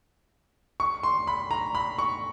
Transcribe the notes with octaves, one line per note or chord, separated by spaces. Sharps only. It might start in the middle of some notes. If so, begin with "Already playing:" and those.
C#6
C6
B5
A#5
B5
C#6